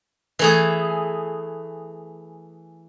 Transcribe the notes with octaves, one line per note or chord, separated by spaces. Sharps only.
E3 A3 G#4